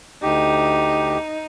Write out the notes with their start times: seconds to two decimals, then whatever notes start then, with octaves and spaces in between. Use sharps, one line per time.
0.23 D2 D#4 G4